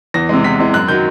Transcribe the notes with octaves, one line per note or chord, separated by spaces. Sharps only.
E2 A#6
C3 E3 G#3
E2 B6
C3 E3 G#3
F#2 F#6
D#3 F#3 G6